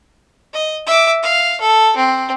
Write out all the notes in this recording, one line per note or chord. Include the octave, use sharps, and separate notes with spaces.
D#5
E5 D6
F5
A4
C4